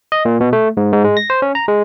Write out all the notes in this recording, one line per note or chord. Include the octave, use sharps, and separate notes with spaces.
D#5
A#2
B2
A3
G#2
G#2
G#3
A#6
C5
C#4
A#5
G#3